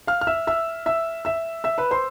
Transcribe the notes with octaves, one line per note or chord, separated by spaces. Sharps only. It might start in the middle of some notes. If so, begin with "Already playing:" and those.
F5 F6
F6
E5 E6
E5 E6
E5 E6
E5 E6
E5 E6
B4 B5
C5 C6